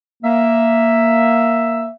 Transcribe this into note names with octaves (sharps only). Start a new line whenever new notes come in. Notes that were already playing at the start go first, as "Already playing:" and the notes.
A#3 E5